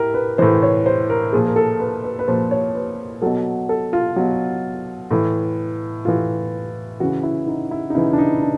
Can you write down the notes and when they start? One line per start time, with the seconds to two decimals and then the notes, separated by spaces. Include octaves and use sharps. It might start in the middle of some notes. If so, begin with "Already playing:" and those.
Already playing: A2 E4 G4 A#4
0.14 B4
0.38 A2 E3 C5
0.63 C#5
0.86 C5
1.10 A#4
1.33 A#2 F3 G#4
1.47 A#4
1.56 A4
1.80 B4
2.04 B4
2.19 B4
2.28 A#2 F3 C5
2.51 C#5
2.75 B4
3.22 B2 F#3 A4
3.69 A4
3.93 F4
4.16 B2 F#3
5.11 A2 E3
6.05 A2 E3 F4
7.00 C#3 E3 F#4
7.23 E4
7.47 D#4
7.71 E4
7.90 D#4
7.95 C#3 E3 E4
8.13 D4
8.18 D#4
8.42 D4